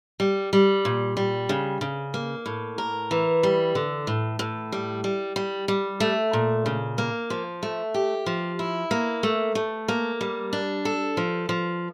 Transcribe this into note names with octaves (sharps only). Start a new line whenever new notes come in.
G3
G3
A#2
G3
C#3
C#3
A#3
A2
A#4
E3
G3
D3
A2
A2
G3
G3
G3
G3
A3
A#2
C#3
A#3
F3
A3
G4
F3
E4
A#3
A3
A3
A#3
G3
D4
A4
F3
F3